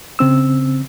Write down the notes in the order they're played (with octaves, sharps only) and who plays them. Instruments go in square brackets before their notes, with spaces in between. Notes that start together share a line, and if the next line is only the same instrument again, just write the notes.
[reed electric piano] C#3 C4 E6